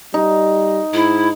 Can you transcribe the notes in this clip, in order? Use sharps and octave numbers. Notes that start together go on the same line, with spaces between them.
G3 D#4
G#2 E4